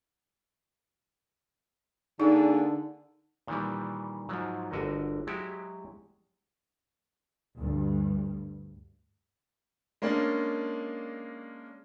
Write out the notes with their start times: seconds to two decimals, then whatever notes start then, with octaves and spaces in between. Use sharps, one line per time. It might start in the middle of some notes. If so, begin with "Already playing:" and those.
2.20 D3 A#3 D4 D#4 G#4
3.47 A#2 D#3 E3 G3
4.29 G#2 F3 F#3
4.71 G1 D3 F#4 A#4 D#5
5.27 F#3 G#3 E4 F#4 G4
7.57 D2 G2
10.02 G#3 A#3 C#4 D4